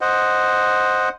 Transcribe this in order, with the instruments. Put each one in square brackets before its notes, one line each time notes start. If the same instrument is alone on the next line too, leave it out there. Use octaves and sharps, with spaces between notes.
[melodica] C5 D#5 F#5